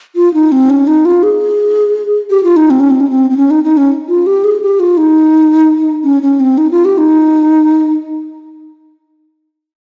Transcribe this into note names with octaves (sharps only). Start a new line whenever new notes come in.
F4
D#4
C4
C#4
D#4
F4
G#4
G4
F4
D#4
C4
C#4
C4
C#4
C4
C4
C#4
D#4
D#4
C#4
F4
G4
G#4
G4
F4
D#4
C#4
C#4
C4
D#4
F4
G4
D#4